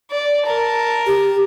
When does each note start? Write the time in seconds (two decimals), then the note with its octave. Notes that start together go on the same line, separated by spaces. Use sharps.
0.11 D5
0.44 A#4 A5
1.07 G4